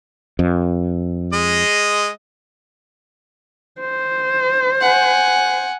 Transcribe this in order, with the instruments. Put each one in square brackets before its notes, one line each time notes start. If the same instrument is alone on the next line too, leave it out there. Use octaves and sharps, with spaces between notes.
[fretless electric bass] F2
[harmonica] G#3 D#5
[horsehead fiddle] C5
[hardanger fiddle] F#5 G#5